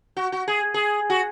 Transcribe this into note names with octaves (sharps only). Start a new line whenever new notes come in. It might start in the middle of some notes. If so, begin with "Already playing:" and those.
F#4
F#4
G#4
G#4
F#4